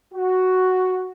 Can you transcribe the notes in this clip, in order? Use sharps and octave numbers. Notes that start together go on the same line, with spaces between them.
F#4